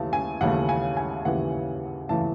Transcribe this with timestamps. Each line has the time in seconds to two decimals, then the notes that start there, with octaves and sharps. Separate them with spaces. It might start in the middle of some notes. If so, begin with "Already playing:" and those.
Already playing: D#2 C#3 E3 A3 A5
0.13 G#5
0.41 D#2 C#3 E3 A3 F#5
0.69 G#5
0.97 G#5
1.25 D#2 C#3 E3 A3 F#5
2.09 C#3 E3 A3 A5